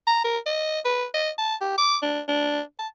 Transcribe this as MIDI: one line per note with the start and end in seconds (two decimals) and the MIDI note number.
0.07 0.20 82
0.24 0.38 70
0.46 0.79 75
0.85 1.05 71
1.14 1.30 75
1.38 1.55 81
1.61 1.75 67
1.78 1.96 86
2.02 2.20 62
2.28 2.61 62
2.79 2.87 81